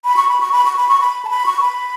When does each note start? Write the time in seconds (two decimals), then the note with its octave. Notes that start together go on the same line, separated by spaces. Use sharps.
0.04 B5
0.16 C#6
0.29 B5
0.40 C#6
0.52 B5
0.65 C#6
0.77 B5
0.89 C#6
1.01 B5
1.25 A5
1.29 B5
1.46 C#6
1.61 B5